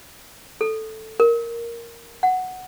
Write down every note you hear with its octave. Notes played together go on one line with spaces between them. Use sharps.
A4
A#4
F#5